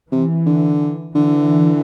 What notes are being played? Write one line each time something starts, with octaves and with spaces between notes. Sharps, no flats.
C3 E3
D3
D3 E3